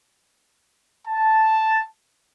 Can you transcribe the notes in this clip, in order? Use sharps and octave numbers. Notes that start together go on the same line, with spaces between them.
A5